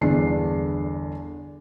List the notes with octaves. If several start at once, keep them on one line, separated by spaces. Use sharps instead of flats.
G1 E2 D3 D4 C7